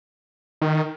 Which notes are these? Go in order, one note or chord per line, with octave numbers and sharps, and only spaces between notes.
D#3